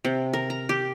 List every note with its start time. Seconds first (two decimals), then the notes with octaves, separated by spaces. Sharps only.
0.05 C3
0.33 A#4
0.50 A#5
0.69 G4